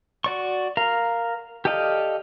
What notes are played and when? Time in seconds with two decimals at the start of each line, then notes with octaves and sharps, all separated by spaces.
0.24 F#4 D5 C#6
0.77 A#4 F5 A#5
1.65 G4 A4 D5 D#5 F5